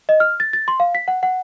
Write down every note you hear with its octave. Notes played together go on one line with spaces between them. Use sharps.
D#5
F6
A6
A6
C6
F5
B6
F#5
F#5